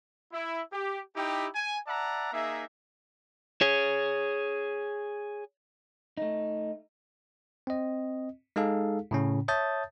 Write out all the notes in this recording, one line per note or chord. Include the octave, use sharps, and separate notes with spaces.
E4
G4
D#4 E4 G4
G#5
D5 E5 F#5 A5 A#5
A#3 D#4 G#4 E5
G#4 C#5
A3 D#4
C4 D#5
G#3 D#4 G#4 A4 F5
A2 C#3 C#4
C#5 E5 A5 D#6 G6 A6